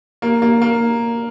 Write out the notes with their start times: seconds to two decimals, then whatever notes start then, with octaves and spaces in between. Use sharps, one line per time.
0.22 A#3
0.42 A#3
0.62 A#3